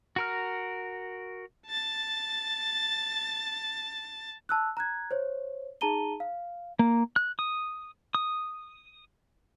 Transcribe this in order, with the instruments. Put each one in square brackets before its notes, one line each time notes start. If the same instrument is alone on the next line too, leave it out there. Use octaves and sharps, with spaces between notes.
[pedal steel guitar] F#4 A#4 F6
[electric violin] A5 A6
[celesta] A5 E6 F#6
A#5 F#6 G#6
C5 C#5
D#4 G#4 A5 A#5 D#7 G7
F5
[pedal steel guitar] A#3
F#6
D#6
D#6